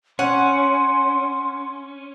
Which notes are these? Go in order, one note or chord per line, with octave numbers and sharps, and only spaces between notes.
C#4 F#5 C6